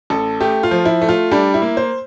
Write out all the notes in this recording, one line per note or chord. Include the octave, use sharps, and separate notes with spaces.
A1 A4
A3 G4
F4
F3
E4
A3
F4
G3 D4
E4
A#3
C5